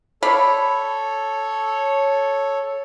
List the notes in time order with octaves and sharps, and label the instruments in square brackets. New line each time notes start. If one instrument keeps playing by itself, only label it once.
[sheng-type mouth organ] A4 C#5 [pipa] D5 F5 B5